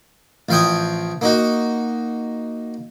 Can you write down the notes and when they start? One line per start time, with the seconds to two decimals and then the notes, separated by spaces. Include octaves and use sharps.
0.49 A1 F3 F5 G5 G#5 D#6
1.21 A#3 D#4 F#4